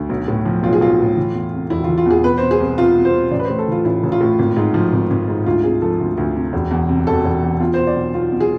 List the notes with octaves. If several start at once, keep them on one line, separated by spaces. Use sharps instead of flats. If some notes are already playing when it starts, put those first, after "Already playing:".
Already playing: D2
B1
A2
F3
B1 F4
G#4
B1 F4
A2
E3
E2
C3
E1 E4
F4
E3
F4
E2 G#4
B2 B4
C5
B2
G#4
C2
C2 F4
B2
C5
B2
A1 D5
B4
C5
A2
A4
E3 F4
A1 E4
A1
F4
A2
G#1
G#2
F3
G#1
G#1
G#2
D2 F4
C3 G#4
F3 A4
D2
D2
C3
E1
E2
C3
E1 A4
E1
E2
B2 F4
B2 C5
D5
B1
B1 F4
B2
G#4